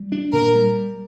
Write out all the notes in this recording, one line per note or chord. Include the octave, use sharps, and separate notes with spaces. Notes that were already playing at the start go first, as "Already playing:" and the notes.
Already playing: G3
D4
A#2 A#4
G3